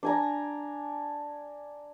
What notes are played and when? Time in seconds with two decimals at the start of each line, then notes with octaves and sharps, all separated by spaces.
0.03 D4 G#5 A#5